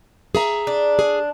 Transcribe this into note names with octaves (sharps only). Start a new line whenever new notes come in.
G#4 E5 A#5
D4
G#4